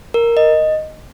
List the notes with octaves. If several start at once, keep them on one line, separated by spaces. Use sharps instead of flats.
A#4
D#5